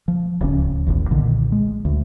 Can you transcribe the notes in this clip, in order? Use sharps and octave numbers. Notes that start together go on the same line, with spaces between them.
F3
D1 C#2 C#4
E1 A1 D#2
B1 A#2 D3 D#3
G#3
D2